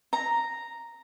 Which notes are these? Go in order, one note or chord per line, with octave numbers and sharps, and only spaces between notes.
A#5